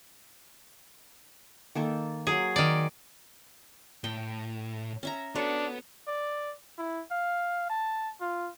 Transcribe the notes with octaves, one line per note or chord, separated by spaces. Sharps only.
D#3 A#3 A4
F#3 G#4 A#4 D6
D#3 D5
A2 G5
C#4 E5 A#5
B3 D4 F#4 A4 C#5
D5
E4
F5
A5
F4